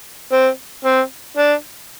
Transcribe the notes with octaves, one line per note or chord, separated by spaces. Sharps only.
C4
C4
D4